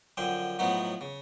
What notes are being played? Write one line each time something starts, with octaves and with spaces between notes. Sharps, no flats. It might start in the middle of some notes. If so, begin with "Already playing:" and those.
F#2 D3 F3 G5 G#5
A2 F3 F#3 B3 D#4 F#4
C#3